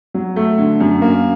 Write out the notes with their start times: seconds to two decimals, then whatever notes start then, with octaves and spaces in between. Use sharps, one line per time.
0.14 F#3
0.36 A3
0.58 D3
0.80 F#2
1.02 A#3